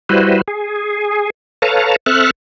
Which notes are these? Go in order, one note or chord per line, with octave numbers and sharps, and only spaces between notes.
G3 E4 F#4 B4 C5
G#4
A4 B4 C#5 F5 A5 A#5
C4 A4 E5 F6 F#6